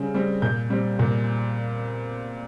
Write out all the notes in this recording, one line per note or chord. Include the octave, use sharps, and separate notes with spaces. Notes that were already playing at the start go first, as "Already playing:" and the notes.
Already playing: C#3 G3 C4
G3 C4
A#2 G6
G3 C4
A#2